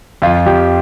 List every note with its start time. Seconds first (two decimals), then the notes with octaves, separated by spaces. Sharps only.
0.22 F2 F4
0.46 F2 G4